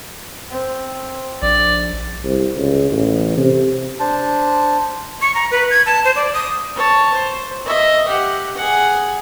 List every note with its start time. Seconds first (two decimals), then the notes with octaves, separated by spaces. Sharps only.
0.50 C4
1.42 A#1 D5
2.24 C2
2.57 C#2
2.92 A1
3.38 C3
4.00 D4 C5 A5
5.21 C#6
5.34 A#5
5.51 B4
5.70 G#6
5.86 A5
6.05 C5
6.16 D5
6.33 D#6
6.75 C#5 A5
7.13 C5
7.65 D#5 E5
8.08 G4 F#5
8.56 G#4 F#5